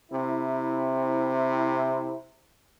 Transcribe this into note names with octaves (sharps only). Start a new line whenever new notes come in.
C3 C4 E4